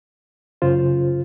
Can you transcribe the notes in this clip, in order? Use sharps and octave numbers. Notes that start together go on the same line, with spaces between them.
F#2 C#3 F4 C5